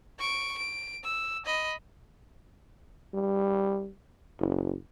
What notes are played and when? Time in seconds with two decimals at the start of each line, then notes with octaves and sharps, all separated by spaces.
0.19 C#6 D7
0.58 D7
1.03 E6
1.46 D#5 B5
3.14 G3
4.39 F#1